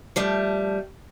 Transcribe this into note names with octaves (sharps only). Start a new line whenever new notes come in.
F3 G3 A3